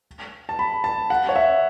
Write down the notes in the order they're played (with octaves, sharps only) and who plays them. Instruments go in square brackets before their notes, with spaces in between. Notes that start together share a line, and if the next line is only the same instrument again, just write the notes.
[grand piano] A5
B5
A5
F#5
C#5
E5